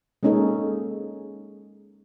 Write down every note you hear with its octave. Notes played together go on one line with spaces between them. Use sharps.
G#3 A#3 C#4 D#4 G#4 A4